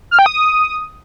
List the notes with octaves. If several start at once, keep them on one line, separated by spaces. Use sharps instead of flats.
F6
G5
D#6